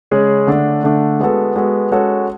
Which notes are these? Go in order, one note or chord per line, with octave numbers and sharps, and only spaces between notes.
C#3 G#3 C#4 G#4
D3 A3 D4
D3 A3 D4
G#3 B3 F#4 A4
G#3 B3 F#4 A4
G#3 C#4 F#4 A4